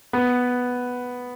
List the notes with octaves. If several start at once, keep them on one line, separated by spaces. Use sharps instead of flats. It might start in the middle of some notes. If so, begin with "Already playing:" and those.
B3